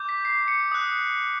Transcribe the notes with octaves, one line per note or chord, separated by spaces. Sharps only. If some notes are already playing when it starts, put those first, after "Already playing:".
Already playing: D6 G6
B6
C7
C#7
D#6 F#6